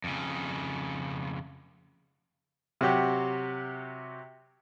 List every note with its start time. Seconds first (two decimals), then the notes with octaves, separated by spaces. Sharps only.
0.04 F2 C#3
2.81 C3 F#3 F#4 G4